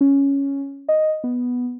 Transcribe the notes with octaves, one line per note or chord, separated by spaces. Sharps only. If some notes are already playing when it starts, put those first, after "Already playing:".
C#4
D#5
B3